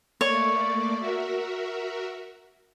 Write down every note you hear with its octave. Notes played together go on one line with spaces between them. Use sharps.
A3 A#3 C#5 D5
F#4 A#4 E5